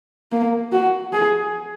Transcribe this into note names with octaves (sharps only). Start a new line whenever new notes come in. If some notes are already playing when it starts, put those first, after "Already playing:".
A#3
F#4
G#4